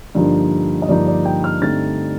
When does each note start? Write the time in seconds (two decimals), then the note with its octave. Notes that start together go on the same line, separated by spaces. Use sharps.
0.15 G2 D3 F3 A#3 D#4
0.82 D#5
0.88 G2 D3 F3 A#3 D#4 D5
1.07 D5
1.25 G5
1.44 F6
1.62 G2 D3 A3 C4 D#4 A6